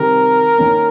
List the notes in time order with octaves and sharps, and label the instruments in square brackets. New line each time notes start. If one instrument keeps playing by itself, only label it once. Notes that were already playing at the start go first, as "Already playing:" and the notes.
Already playing: [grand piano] C3 D#3 G3 C4 G4 [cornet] A#4
[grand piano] D#3 A#3 C#4